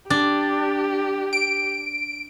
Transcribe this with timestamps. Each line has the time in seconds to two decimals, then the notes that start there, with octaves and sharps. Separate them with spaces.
0.10 D4 G4
1.33 D7